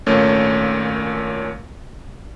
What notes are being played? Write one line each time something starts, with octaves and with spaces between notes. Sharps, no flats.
G#1 A#2 A3 C#4